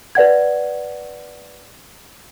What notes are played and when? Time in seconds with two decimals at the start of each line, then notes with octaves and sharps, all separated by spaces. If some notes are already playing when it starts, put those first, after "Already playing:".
0.15 B4 D5 F#5 G#6